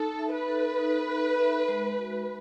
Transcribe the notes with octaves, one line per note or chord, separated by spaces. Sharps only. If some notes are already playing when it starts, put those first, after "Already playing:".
Already playing: D#4 A4
E5
B4
A4
D#4
D#4
E5
G#3
F#4